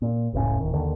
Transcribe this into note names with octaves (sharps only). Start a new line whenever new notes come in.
A#2
F1 C#2 A2 C#4
D1 D#3
D#2 D3 D#3